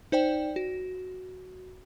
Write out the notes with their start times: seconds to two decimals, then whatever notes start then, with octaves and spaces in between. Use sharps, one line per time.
0.12 D#4 C5 D5 G5
0.56 F#4